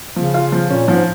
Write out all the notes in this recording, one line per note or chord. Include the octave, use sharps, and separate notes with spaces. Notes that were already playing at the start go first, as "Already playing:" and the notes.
C#3 F3
F4
F3
A#2 C#4
G#2 F3